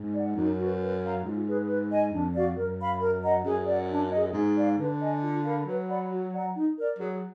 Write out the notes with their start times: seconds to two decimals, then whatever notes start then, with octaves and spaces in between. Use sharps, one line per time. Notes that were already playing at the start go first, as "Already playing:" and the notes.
Already playing: G#2
0.14 D5 F#5
0.36 F#2 D#4
0.58 F#4 B4
0.80 B4
1.03 F5 A#5
1.24 G#2 F4
1.46 G#4 B4
1.68 B4
1.91 D#5 G#5
2.13 F2 D4
2.35 F#4 D5 F5
2.57 F#2 A#4
2.79 F5 B5
3.01 A#4
3.23 D#5 F#5 A#5
3.45 F#2 G#4
3.67 D5 F#5
3.89 D4
4.11 G#4 D#5
4.33 G#2 G#4
4.56 D5 F5
4.77 D3 B4
4.99 D#5 G#5
5.22 F4
5.44 A#4 F5 B5
5.66 F#3 B4
5.88 D5 F#5 B5
6.10 F#4
6.32 D5 F#5 A#5
6.54 D#4
6.76 A#4 D5
6.98 F#3 G#4